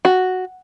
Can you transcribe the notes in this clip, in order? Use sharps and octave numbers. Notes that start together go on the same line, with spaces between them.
F#4